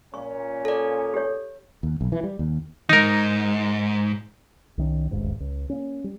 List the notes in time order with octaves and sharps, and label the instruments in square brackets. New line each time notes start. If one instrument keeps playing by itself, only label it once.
[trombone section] A#2 C#4 [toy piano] C#6
[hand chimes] A4 D5
[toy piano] G4 C#5
[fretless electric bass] D#2
B1
E3
G3
D#2
[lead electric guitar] E2 G#2 [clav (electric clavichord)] D#4 A#4
[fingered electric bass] C2 D#3 C#4
E1 A1 D#2 G#2
C#2
A#3 C#4
G3